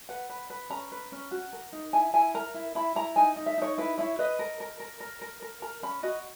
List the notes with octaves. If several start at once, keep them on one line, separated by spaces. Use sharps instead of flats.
B4 F#5
B4
B4
C#4 A#5
B4
C#4
F#4
A#4
D#4
E4 G#5
E4 G#5
A#4 A#5
E4
E4 B5
E4 A#5
D#4 G#5
D#4
E5
D#4 C#5
E4 B4
E4 C#5
B4 D#5
A#4
A#4
A#4
A#4
A#4
A#4
A#4 A#5
C#4 B5
F#4 D#5